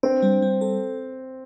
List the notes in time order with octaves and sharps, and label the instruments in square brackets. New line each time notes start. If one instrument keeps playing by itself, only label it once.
[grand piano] C4 [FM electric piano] D4
[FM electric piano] G3
G3
A4